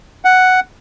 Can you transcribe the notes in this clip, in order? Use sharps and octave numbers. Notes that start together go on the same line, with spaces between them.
F#5